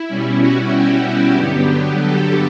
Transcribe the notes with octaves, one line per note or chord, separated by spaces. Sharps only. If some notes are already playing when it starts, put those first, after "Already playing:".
Already playing: E4
B2 G3 C#4
F#4
G4
G4
G2 D3 F#3 B3
A4